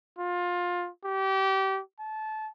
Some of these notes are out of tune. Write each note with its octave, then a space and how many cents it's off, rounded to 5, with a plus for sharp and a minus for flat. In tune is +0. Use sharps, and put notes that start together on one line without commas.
F4 +20
G4 -25
A5 -20